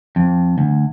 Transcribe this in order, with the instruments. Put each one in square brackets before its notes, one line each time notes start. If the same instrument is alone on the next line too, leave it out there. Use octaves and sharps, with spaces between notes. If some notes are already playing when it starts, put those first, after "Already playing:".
[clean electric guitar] F2
D2